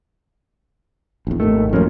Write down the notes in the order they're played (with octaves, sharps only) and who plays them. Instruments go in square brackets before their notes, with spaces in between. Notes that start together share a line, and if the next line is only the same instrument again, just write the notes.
[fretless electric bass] A#1 E2
[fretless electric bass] G#1 D#2 D#3 [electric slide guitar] A3
[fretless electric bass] A1 F#2 [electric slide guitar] F3 A#3 C#4